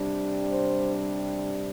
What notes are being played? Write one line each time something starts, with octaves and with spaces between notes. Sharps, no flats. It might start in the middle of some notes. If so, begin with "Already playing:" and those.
Already playing: C3 G3 D4
C5